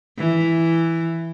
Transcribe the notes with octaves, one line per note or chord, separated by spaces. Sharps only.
E3